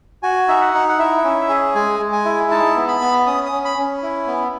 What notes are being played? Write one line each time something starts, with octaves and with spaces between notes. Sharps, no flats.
F#4 G#5
D#4 E5
F#5
D#4
F#5
E4 E5
C#4
G#4
G#3 G#5
G#3
G#5
E4
D#4 A5
B3
B5
B3
C#4 D#6
D#6
C#4
B5
C#4
E4
B3